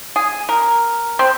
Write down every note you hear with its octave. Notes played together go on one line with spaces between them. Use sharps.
G#4
A#4
C4